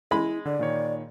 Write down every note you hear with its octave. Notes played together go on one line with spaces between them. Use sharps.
G#3 E4 B5
D3 D5
A#2 D#3 C#5